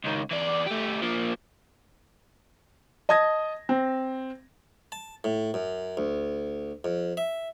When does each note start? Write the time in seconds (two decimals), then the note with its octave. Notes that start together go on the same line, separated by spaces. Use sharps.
0.04 C#2 D#3
0.31 E3 D5
0.67 A3 G4
1.02 F3 A#3
3.09 D#5 A5 D#6 G#6 A#6
3.69 C4
4.92 A5
5.24 A2
5.54 F#2
5.97 D2
6.84 F2
7.17 E5